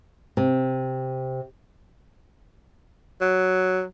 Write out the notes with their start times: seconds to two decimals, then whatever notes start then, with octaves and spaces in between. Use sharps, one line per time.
0.37 C3
3.21 F#3